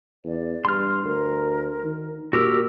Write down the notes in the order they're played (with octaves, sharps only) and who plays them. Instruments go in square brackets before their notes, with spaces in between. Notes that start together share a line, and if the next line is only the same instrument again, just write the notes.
[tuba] E2 [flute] D5
[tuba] G2 [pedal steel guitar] C6 F6
[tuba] D2 [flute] A#4
[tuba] D#3
[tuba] A#2 [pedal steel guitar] F#4 G4 A#4 [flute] E6